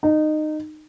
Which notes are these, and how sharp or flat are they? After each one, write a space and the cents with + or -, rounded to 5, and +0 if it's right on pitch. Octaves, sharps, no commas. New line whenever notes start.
D#4 -20